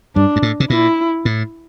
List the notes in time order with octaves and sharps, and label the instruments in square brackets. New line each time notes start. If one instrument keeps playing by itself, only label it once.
[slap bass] G2 [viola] D4
[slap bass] G2
A2
C3
[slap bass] A#2 [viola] E4
[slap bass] A2